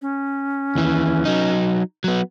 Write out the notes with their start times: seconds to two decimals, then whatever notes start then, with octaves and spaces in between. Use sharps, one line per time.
0.02 C#4
0.75 D#2 E3
1.25 F#3 D#4
2.04 F#3 B3